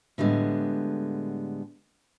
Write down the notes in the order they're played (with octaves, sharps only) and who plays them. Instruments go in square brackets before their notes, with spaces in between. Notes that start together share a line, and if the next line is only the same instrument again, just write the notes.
[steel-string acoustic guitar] A2 D3 G3 G#3 B3